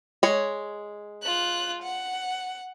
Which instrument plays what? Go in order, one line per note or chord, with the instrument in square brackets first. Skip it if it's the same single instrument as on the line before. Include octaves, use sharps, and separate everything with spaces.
[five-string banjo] G#3 C#5
[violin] F4 F#6
F#5